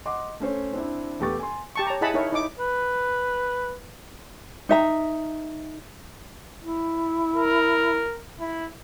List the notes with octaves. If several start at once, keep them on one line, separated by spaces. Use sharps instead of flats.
D#5 F#5 C6 D6
A3 C#4 C5 C#5
C4 D4 E4
E1 A3 B3 G4 C#6 A6
G#5 C6
G4 A5 C#6
C#5 A5 A#5
E4 G#4 D#5 F#5 A5 B5
D#4 E4 A#4 C#5
D#4 E4 D6
B4
D#4 E5 A#5
E4
A#4
E4